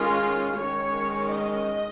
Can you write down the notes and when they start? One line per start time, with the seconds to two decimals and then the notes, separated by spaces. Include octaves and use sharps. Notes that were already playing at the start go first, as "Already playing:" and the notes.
Already playing: D#3 G#3 C#4 F4
0.55 D#3 G#3 C#4 C#5
1.30 D#5